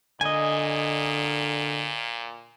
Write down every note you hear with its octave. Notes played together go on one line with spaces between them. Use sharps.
A#2 D3 D#5 G#5